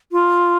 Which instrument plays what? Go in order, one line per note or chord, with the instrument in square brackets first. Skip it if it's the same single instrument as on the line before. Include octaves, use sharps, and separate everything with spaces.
[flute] F4